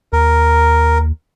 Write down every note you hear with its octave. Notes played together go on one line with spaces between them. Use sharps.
D#2 A#4